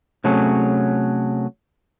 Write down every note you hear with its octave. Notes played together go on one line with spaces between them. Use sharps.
C3 F#3 A3 C#4 G#4